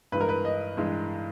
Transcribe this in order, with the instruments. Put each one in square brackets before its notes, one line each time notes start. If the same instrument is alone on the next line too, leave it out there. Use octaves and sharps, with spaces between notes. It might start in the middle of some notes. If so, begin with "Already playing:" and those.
[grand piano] G2 E3 G#3 B4
A#4
B4
D#5
G2 E3 G#3